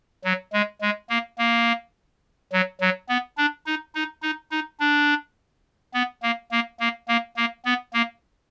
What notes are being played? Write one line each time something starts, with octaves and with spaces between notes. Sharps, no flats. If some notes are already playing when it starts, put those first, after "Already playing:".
F#3
G#3
G#3
A#3
A#3
F#3
F#3
B3
D4
D#4
D#4
D#4
D#4
D4
B3
A#3
A#3
A#3
A#3
A#3
B3
A#3